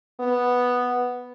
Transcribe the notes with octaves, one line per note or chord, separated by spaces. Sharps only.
B3